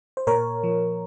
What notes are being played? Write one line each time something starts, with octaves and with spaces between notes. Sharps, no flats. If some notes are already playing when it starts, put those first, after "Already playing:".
C5
A#2 A#4 C#5
F3